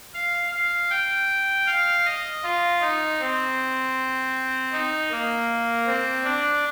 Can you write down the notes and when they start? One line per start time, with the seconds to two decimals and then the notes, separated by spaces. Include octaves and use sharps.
0.14 F5
0.52 F5
0.90 G5
1.67 F5
2.05 D#5
2.43 F4
2.80 D#4
3.20 C4
4.72 D#4
5.11 A#3
5.86 C4
6.24 D4